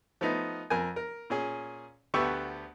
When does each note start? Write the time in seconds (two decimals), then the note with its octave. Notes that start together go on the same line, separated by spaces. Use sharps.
0.21 F3 A3 B3 D#4
0.70 F2 A#4 G#5
0.96 A#4
1.30 A#2 C#4 G#4
2.14 D2 A3 B3 G4 E5 C#6